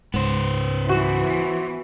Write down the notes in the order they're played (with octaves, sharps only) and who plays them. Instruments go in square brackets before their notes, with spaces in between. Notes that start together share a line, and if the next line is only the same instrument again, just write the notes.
[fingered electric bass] C#2 G#2 [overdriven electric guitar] B3 C5
[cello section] E3 [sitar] F#4